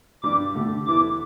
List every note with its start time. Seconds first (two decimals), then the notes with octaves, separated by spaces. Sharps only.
0.22 G2 G3 D4 D6
0.54 D3 A3 G4
0.86 E2 E3 B3 E4 A4 D6